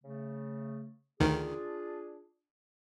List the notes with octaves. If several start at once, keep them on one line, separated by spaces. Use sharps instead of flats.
C#3 A3
D2 D#3 D4 F4 G#4